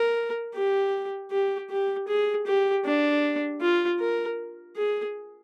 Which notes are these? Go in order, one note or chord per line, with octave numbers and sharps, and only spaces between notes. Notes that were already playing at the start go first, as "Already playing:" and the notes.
Already playing: A#4
G4
G4
G4
G#4
G4
D4
F4
A#4
G#4